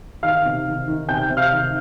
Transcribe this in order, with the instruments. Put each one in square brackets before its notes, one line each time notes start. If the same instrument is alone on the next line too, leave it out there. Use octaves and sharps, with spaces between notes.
[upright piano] D#3 F5 F6
C3
D#3
D#3
C3 G5 G6
C3
F5 F6
D#3